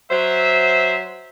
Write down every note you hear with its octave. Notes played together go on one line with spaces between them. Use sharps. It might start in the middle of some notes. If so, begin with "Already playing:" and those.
F#3 C5 E5